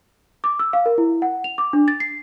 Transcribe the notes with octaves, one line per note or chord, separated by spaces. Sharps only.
D6
E6
F5
A#4
E4
F#5
F7
D6
D4
A6
C7